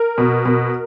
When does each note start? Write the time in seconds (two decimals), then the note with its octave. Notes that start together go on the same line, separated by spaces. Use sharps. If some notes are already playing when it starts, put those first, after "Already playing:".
Already playing: A#4
0.18 B2
0.45 B2